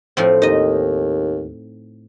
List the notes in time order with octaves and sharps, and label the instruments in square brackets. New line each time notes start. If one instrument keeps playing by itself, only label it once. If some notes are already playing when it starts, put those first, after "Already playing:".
[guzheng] A2 F3 C4
[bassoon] D#2 [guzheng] D#4 D#5